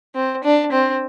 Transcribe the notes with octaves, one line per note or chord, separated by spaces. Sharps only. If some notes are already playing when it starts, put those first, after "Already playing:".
C4
D4
C4